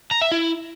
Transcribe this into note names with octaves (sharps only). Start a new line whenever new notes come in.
A#5
E5
E4